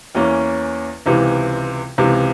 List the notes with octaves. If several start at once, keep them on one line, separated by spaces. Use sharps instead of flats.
E2 E3 A#3 C#4
C#2 C3 E3
C#2 C3 E3